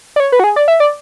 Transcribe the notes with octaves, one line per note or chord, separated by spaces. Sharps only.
D5
C#5
B4
F#4
G#4
D5
E5
D5